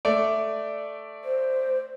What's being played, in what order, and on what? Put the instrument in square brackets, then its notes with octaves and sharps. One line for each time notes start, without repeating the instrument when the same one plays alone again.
[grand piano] A3 [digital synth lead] D5
[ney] C5